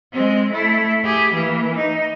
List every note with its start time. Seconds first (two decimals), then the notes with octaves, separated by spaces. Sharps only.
0.12 G#3 C4
0.52 A3 E4
1.04 G4 G#4
1.33 E3 A#3
1.75 D#4